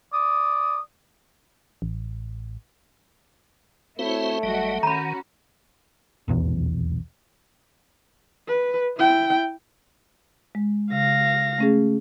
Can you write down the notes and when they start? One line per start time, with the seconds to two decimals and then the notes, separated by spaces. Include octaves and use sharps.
0.13 D5 D#6
1.82 A1
3.99 A3 C4 E4 F#4 C5 C#5
4.43 G1 F#3 G3 F#4 D#5
4.83 D#3 C#4 F#4 A#5 B5
6.28 D#1 B1 E2
8.48 B4
8.97 E4 G5
10.55 G#3
10.91 C#3 F5 A#6
11.58 A3 C#4 G#4